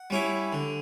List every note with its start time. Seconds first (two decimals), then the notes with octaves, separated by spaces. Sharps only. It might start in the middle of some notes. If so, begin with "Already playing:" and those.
Already playing: F#5
0.10 G3 C#4 E4
0.53 D3